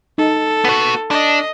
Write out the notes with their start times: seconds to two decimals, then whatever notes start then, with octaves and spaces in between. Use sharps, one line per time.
0.18 D#4 A4
0.65 B3 F#4
1.11 D4 D#5